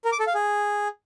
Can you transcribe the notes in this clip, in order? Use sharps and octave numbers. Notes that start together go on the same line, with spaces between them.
A#4
D6
A4
F5
G#4